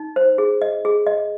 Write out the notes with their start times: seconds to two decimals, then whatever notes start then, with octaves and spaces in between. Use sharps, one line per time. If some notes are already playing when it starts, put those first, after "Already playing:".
Already playing: D#4
0.16 C5
0.38 G#4
0.62 D#5
0.85 G#4
1.07 D#5